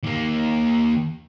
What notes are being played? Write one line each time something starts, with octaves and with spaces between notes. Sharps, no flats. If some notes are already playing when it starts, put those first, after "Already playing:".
D#2 A#3